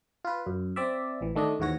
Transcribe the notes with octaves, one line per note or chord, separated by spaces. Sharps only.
F4 B4
F#2
C4 D5 E5
A1 E3
D#3 A3 D4 D#5
D#2 G#2 E3 F#4 C#5 A#6